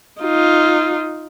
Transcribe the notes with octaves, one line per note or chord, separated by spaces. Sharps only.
D#4 F4